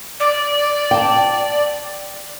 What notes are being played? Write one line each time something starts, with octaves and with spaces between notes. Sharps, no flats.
D5
G5 A5